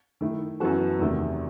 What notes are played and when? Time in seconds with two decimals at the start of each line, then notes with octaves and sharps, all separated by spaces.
0.21 D#3 A3 E4
0.60 F#2 E3 B3 F#4 A4
0.99 E2 C3 D#3 A3